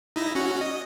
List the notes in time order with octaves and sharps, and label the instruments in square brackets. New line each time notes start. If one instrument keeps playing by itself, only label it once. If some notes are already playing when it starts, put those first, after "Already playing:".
[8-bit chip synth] D#4 E4 A#6
C#4 F#4
D#5